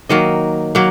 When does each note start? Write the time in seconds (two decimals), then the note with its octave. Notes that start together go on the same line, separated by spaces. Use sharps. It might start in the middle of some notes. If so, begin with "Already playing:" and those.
0.09 D#3 F#3 A#3 D#5
0.75 F#3 A#3